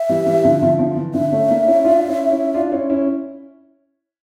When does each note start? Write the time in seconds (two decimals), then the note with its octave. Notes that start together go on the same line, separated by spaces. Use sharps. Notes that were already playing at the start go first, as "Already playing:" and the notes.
Already playing: E5
0.09 E3 G3
0.26 E3 G3
0.45 D3 F3
0.62 D3 F3
0.79 D3 F3
0.97 E3
1.14 D3 E5
1.32 A3 C#4
1.50 A#3 D4
1.67 C#4 E4
1.84 D4 F4
2.08 C#4 E4
2.31 C#4 E4
2.54 D4 F4
2.72 C#4 E4
2.90 C#4 E4